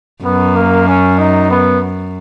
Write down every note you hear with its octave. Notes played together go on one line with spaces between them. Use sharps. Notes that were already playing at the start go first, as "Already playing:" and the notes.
F#2 B3
A#3
C#4
D#4
B3